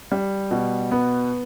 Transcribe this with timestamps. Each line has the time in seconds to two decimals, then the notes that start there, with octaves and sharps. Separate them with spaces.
0.12 G3
0.51 B2
0.91 B3